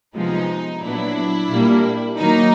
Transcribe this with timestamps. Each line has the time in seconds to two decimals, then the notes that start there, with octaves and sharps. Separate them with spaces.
0.16 C3 F3 G#3 B3 D#4
0.83 A#2 F#3 B3 D4 E4
1.50 A#2 G3 A#3
2.18 D#3 F#3 A#3 D#4